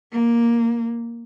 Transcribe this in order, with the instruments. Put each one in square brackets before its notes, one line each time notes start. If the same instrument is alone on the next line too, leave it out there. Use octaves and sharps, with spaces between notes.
[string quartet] A#3